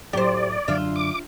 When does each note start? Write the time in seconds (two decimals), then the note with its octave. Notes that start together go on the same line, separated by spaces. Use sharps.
0.13 A2 F#3 A3 G4 C5 D5
0.68 F#2 D3 F#3 D4 F4 E5
0.96 D6